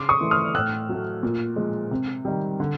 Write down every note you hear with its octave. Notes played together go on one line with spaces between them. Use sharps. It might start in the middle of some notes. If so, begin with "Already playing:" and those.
Already playing: C#3 C6 D6
C#6 D#6
E3 A3
D#6 F6
A2 E6 F#6
F#3 A3
A#2
F3 G#3
C3
D#3 G3
D3